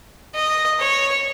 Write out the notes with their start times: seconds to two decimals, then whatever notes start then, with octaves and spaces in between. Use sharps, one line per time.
0.35 D#5
0.80 C#5